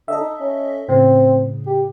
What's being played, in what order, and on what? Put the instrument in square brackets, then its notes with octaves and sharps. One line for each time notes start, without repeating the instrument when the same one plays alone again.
[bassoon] D3 [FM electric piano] A4 D#5 E5
[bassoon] D#4
C#4
[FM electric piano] A2 C#3 [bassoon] C4
[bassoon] G4